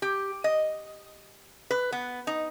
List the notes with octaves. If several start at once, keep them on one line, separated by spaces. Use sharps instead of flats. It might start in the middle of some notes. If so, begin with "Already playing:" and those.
G4
D#5
B4
B3
D#4